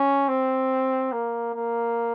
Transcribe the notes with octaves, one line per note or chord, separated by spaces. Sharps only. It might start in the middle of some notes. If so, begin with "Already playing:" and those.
Already playing: C#4
C4
A#3
A#3